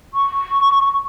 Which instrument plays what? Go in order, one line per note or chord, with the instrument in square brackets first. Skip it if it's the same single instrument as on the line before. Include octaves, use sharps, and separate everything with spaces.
[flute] C#6